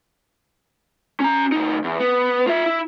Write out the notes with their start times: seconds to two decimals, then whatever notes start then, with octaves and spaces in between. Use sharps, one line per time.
1.20 C#4 A#5
1.52 D2 D#4
1.84 E2
2.00 B3
2.47 F4 E5
2.66 E4